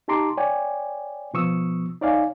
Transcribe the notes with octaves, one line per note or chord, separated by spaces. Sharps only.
D#4 G4 A5 A#5 C6 D6
C#5 D5 G5 G#5
B2 F3 B3 C#6 D#6 E6
D#4 C#5 D5 F5 G#5